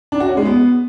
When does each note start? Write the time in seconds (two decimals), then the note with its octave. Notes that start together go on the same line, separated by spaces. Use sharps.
0.12 D4
0.20 F#4
0.29 C#4
0.37 G#3
0.45 B3